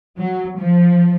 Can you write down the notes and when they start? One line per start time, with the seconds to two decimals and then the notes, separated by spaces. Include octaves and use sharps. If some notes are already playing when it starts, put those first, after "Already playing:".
0.17 F#3
0.58 F3